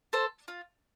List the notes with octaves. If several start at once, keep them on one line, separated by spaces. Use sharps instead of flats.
A4 C5
F4